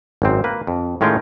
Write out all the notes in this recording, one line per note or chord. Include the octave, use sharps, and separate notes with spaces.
G#1 F#2 C4
A#3 B4
F2
A2 D#3 G#3 C#4 F4 G5